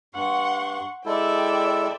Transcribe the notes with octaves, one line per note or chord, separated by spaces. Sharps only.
G2 F#5 C6 C#6
G#3 E4 A4 D5 E5 G5